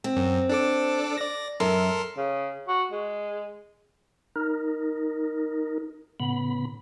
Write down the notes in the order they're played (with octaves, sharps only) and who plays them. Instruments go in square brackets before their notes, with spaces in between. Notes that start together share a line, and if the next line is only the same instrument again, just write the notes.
[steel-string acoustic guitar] C4
[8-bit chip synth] F#2
D4 A4 D6
D5 A#6
[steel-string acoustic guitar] F#2 [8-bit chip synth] A4 A#4 C6
[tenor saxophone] C#3
F#4
G#3
[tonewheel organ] D#4 A#4
A2 C#3 B3 B5